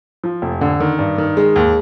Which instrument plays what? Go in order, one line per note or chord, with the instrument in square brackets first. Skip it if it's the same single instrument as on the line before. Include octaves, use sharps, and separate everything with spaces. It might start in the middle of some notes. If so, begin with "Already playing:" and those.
[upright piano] F3
F1
D3
D#3
G2
D#3
G#3
D#2